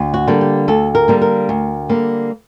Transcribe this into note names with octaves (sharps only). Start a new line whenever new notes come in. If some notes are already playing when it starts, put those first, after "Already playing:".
Already playing: D2
F#4
D3 G3 A#3
G4
D2 A4
A#4
D3 G3 A#3
A#4
D2
D3 G3 A#3